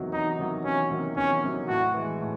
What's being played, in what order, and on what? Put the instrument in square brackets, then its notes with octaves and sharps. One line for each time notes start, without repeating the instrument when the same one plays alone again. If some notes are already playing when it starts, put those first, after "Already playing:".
Already playing: [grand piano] E2 C3 D#3 F#3
[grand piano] E2 [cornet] D#4
[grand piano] C3 D#3 F#3
[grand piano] E2 [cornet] C#4
[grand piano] C3 D#3 F#3
[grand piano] E2 [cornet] C#4
[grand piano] C3 D#3 F#3
[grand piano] A2 [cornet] F#4
[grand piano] E3 G#3
A2